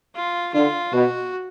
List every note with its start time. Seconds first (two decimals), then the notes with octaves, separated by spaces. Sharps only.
0.14 F4
0.53 D3 F4
0.93 B2 F#4